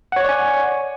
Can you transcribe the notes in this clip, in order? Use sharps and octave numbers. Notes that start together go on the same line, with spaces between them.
C#5 D5 F#5 G#5 C#6